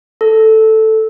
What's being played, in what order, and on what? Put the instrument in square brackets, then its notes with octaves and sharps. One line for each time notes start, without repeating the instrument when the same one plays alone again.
[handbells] A4